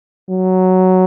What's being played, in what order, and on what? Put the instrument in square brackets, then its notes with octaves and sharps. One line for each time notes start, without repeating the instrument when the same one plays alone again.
[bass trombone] F#3